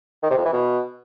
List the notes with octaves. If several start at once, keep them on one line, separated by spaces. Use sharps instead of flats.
D#3
C3
F2
E3
B2